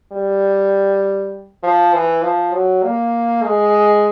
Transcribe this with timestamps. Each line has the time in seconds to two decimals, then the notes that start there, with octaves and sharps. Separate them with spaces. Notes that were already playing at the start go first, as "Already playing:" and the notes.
0.12 G3
1.63 F3
1.94 E3
2.23 F3
2.53 F#3
2.83 A#3
3.43 G#3